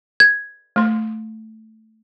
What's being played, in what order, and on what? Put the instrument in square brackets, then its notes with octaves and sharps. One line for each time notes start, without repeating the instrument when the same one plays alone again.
[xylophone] G#6
[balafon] A3 C6